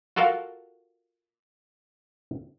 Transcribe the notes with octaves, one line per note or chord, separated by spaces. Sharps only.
F4 F#4 A4 A#4 F5